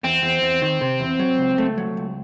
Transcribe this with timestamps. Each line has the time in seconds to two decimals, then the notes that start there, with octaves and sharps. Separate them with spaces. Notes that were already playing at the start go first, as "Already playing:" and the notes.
0.03 E2 C4
0.22 E2
0.42 E2
0.62 D#3
0.81 C3
1.00 E2
1.19 F#3
1.38 C#2
1.58 A3
1.78 F#3
1.97 C#2